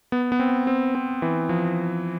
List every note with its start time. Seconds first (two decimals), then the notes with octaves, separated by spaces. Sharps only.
0.12 B3
0.32 B3
0.39 C4
0.67 C4
0.95 C4
1.22 E3
1.49 F3